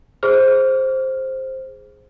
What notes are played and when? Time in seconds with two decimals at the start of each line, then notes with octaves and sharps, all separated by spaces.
0.23 G#4 C5 F6